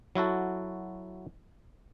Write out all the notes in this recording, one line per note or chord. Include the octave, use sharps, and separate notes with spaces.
F#3 E4 F#4 A4